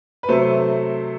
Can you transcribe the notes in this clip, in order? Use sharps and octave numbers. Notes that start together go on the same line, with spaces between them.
B4
C3 F#3 A3 C5